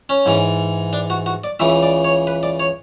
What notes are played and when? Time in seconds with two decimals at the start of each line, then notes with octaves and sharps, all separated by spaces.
0.09 C#4
0.26 G#2 E3
0.93 D4
1.10 F#4
1.26 F#4
1.44 D5
1.60 C#2 C#3 E3 E5
1.83 D5
2.04 C#5
2.27 B4
2.43 D5
2.60 C#5